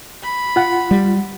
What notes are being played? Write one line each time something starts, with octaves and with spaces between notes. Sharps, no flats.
B5
F4 F#5
G3